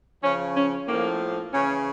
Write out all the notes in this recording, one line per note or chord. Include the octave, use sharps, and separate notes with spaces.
C#3 F3 C#4
C#4
A2 F3 A#3
C#3 E3 C#4